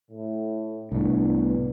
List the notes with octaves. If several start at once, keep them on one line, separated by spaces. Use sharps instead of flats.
A2
C2 A2 B3 D4